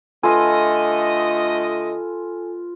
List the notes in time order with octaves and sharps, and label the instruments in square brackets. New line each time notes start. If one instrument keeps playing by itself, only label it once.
[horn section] D3 A3 D#5 [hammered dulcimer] F4 B4 [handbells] A4 G#5